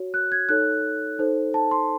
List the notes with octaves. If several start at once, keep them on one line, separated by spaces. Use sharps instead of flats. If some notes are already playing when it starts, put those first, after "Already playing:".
Already playing: F#4 C#5
F#6
G#6
D#4 A4 C#5 F#6
D#4 A4 C5
A5
C6